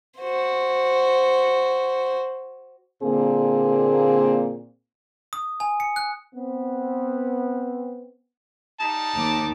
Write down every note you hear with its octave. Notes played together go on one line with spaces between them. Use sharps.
F#4 C5
A#2 D3 A#3 C4 G#4
D#6
G#5
C#7
F#6
B3 C4
G3 D#4 A5
D#2 D6